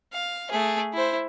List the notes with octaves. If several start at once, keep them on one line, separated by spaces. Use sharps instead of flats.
F5
A3 G#4
E4 C5